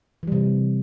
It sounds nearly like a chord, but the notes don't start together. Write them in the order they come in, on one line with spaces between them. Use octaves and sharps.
E3 G3 C3